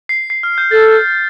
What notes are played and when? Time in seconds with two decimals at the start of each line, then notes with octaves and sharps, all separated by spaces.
0.09 C7
0.30 C7
0.43 F6
0.58 G6
0.71 A4 A6